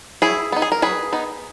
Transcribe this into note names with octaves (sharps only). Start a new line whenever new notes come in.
F#3 E4 G#4
B3 D#4
G#4
A#4
F#3 G#4 B4
B3 D#4